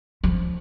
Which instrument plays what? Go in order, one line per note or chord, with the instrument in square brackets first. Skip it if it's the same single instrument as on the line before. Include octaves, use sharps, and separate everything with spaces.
[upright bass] F3